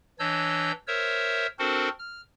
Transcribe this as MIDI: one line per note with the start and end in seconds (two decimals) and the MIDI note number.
0.19 0.72 52
0.19 0.72 62
0.19 0.72 73
0.19 0.72 75
0.19 0.72 88
0.19 0.72 91
0.87 1.47 70
0.87 1.47 72
0.87 1.47 73
0.87 1.47 76
0.87 1.47 88
1.59 1.89 60
1.59 1.89 62
1.59 1.89 66
1.59 1.89 69
1.59 1.89 70
1.59 1.89 72
1.99 2.21 89